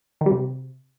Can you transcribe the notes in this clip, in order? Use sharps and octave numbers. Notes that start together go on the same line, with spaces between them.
D#3
G3
C3